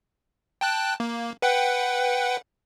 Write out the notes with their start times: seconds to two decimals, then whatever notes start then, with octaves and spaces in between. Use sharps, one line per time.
0.61 G5 A5 F#6
1.00 A#3
1.42 B4 F#5 G5